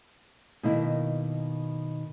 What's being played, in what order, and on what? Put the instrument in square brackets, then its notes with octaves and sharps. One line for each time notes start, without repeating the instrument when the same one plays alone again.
[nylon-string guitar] B2 D#3 A#3 E4 A#4